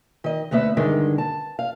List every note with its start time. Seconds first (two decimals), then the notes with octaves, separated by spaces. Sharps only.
0.24 D#3 D#5
0.51 D2 A3 B3 B4 E5
0.77 G2 D3 D#3 G#3
1.18 A5
1.59 F5